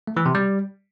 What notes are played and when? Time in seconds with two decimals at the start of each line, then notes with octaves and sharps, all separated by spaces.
0.07 A3
0.17 E3
0.26 C3
0.35 G3